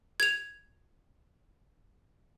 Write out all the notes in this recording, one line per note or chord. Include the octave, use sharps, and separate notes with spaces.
G#6 F7